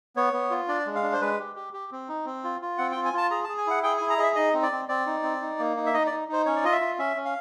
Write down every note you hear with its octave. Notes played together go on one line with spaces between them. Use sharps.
B3 C#5
B3
F4
D4 D5
G#3
F5
D4
C5
G#3 B4
G4
G4
G4
C4
D#4
C4
F4
F4
C4 F#5
G5
F4
G#5
F4 A5
G#4 A#5
A5
G#4
G#5
E4 F#5
G#4 G5
E4 G#5
A#5
G#4 D#5 E5
D#4 D#5
C4
D5
C4
C4 D5
D#4
C4
D#4
A#3
D#4
E5
D#4 D#5
D5
D#4
D#4 C5
C#4 C#5
D5
F4 D#5
E5
F4
C#4 E5
C#4
F5